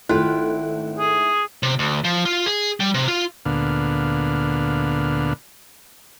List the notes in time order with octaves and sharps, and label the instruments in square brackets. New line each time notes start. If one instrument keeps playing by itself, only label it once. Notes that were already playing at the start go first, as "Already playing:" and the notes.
[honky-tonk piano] G#1 A3 F#6 [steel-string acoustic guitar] E4 G5 [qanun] F4
[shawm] G#4
[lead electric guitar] C3
D2
F3
F4
G#4
G3
C3
F4
[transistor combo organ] D2 A#2 D3 B3 F5